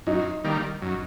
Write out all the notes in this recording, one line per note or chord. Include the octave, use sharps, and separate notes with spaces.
F#2 D#4
D#3 G3 A#3
F#2